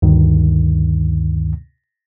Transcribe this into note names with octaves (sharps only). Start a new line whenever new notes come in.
D2 G2 D#3